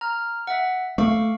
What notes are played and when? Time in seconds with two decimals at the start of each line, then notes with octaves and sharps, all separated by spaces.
0.01 A#5 F6
0.47 E5 F#5
0.98 A3 F5 C#6 D6